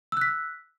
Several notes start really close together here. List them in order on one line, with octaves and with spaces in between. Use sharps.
E6 F#6 B6